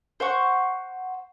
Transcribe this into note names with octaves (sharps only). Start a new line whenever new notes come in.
C5 F#5 C#6